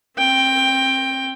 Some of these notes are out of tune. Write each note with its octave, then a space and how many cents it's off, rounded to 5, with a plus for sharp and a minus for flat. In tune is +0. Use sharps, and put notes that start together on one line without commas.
C4 +30 G5 +10